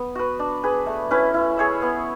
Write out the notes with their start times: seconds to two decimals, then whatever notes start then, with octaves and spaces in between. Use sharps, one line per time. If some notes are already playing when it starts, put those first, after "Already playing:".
Already playing: B3
0.15 F#4 B4
0.39 D4
0.63 G#4 B4
0.86 A3
1.11 C#4 E4 B4
1.34 E4
1.57 G#4 C#5 E5
1.82 B3